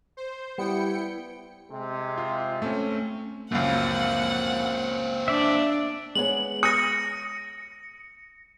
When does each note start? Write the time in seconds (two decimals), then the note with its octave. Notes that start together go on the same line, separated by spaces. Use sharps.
0.17 C5
0.58 G3 B3 E4 G5 C#7
1.71 C3 G#3
2.18 F4
2.62 A3 C4 C#4
3.52 C#2 F#2 A#3 C4 F#5
5.28 D4 D5 E5
6.15 G#3 B3 C#5 F#7
6.63 D#6 A#6 C#7